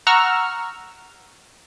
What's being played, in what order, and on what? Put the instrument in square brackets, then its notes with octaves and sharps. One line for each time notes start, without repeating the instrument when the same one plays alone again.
[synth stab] F#5 A#5 C#6 E6 F6